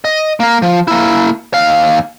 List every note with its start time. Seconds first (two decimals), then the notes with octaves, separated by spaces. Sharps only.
0.05 D#5
0.40 A#3 A#4
0.62 F3
0.88 A#3 E4
1.54 D#2 F5